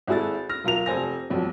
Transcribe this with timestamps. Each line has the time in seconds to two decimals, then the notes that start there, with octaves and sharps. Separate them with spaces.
0.08 G#1 E4 F#4 G#4 A4 A6
0.50 F6 A#6
0.64 B1 F4 A#4 F7
0.86 F1 A4 C5 G#5 A#6
1.30 B1 F2 B2 G3